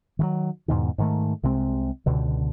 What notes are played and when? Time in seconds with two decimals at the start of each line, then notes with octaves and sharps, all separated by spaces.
0.19 D#3 E3 F#3
0.68 E2 G#2 B2 D#3
0.98 G#2 D#3 A3
1.43 C2 C3 G#3 C4
2.06 C#2 B2 D3